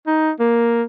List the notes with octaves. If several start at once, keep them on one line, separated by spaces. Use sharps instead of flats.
D#4
A#3